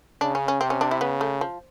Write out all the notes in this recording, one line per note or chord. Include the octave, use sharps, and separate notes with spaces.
C#3 D4
C#4
C#4
C3 C4
C#4
D4
E4
C#3 B3
A3
F3